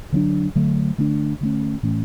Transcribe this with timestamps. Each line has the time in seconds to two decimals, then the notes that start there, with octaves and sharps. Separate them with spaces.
0.12 D3 F#3 B3 D4
0.56 D3 F#3 A3
0.98 D3 A3 D4
1.41 D3 A3 C#4
1.83 A2 E3 A3 C#4